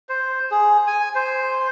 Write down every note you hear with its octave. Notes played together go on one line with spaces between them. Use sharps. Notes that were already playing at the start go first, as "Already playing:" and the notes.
C5
G#4
G#5
C5